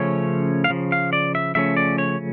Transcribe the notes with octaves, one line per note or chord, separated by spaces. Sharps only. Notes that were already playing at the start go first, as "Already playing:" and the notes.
Already playing: C#3 F3 A3 C#4 C#5
F5
C#3 F3
F5
D5
E5
C#3 F3 A3 C#4 E5
D5
C#5